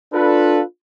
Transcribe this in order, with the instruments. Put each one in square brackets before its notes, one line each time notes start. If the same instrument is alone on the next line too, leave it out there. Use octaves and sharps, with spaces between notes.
[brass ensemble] D4 F4 A4 B4